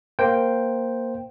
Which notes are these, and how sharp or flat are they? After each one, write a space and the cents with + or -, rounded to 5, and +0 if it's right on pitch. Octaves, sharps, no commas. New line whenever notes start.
A#3 +0 C5 +0 G5 +0